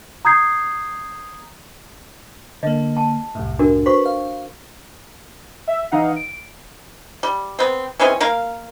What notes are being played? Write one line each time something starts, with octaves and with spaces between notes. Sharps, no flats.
A#5 D#6 G6 G#6 C7
D3 A#3 D#5
A5
C2 F#2 A2
D4 F#4 A#4
F#4 B4 C5 C#6 B6
F5
E5
E3 D#4 F5 F#5
D7
G3
B3 C4
E3 G#3 C4 C#4
A#3 A#4 F5